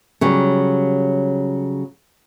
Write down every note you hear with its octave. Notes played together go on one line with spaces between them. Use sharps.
C#3 F#3 G3